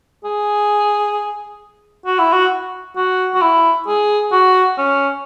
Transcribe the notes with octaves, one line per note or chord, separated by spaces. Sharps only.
G#4
F#4
E4
F#4
F#4
F#4
E4
G#4
F#4
C#4